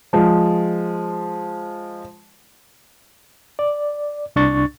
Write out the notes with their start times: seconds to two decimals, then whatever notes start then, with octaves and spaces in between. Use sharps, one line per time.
0.13 F3 G#3
3.59 D5
4.36 C2 D4 C#6 A6